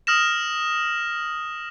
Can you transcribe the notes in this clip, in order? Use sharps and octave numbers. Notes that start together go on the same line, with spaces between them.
D#6 F6 A#6 E7